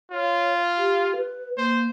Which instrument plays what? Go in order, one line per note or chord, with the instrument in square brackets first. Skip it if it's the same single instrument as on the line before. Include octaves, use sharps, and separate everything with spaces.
[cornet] F4 [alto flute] C#5
[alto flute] G4
B4
[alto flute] A#3 [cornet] C5